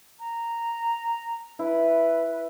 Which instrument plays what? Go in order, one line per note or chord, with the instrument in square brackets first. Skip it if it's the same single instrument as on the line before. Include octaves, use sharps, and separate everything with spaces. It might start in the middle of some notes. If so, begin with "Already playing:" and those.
[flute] A#5
[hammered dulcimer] E4 [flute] B4
[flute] B4